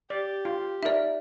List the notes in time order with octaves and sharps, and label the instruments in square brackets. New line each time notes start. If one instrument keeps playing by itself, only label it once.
[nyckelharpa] G4 [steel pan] D5
[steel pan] F4
[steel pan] D#4 A#4 [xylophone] D5 E5